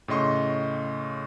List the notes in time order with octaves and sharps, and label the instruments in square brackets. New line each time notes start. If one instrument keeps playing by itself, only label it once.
[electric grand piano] A2 C#3 D#5 C6 C#6